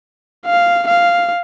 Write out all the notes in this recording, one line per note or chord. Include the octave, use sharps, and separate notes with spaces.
F5
F5